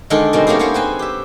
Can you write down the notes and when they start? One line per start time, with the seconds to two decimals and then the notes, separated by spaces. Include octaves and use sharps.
0.10 D3 D#3 G#3 G#4 A4
0.33 B2 D#3 G3 G#3 C4
0.47 A3 A#3 C#4 G4 G#4
0.59 A#3 B3 G#4 C5 C#5
0.74 C4 B4 G#5 C6
0.99 G4 E5